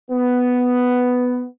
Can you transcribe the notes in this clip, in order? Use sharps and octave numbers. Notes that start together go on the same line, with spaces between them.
B3